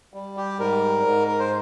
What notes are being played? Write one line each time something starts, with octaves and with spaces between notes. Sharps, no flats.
G3
G4
G#2 A#4
G#2
A#4
C5